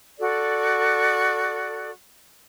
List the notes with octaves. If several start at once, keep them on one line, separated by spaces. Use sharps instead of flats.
F#4 A4 D5